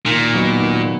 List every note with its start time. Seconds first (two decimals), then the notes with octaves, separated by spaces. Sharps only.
0.06 A#2 D#3
0.34 F#3 B3 D#4
0.60 D#3